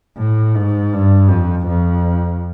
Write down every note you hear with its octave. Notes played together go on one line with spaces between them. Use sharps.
A2
G#2
G2
F2
F2